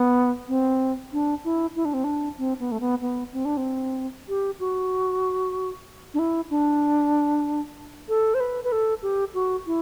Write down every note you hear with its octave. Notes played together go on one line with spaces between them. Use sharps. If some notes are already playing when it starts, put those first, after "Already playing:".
Already playing: B3
C4
D4
E4
E4
D4
C4
D4
C4
B3
A3
B3
B3
C4
D4
C4
G4
F#4
D4
E4
D4
A4
C5
B4
B4
A4
G4
F#4
E4